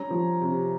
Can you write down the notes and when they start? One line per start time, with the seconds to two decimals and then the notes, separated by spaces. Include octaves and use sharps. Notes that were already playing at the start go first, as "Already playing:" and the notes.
Already playing: G3 C#4 A#5
0.10 F3
0.41 C3